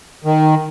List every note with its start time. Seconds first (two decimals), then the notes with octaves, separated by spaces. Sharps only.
0.25 D#3